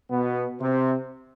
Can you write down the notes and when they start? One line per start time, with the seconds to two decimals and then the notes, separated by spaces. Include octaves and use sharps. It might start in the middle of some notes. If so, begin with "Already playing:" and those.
0.10 B2 B3
0.60 C3 C4